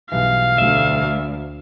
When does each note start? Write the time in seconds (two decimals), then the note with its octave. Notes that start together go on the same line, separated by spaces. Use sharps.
0.12 B1 G2 E3 F5
0.58 D2 E5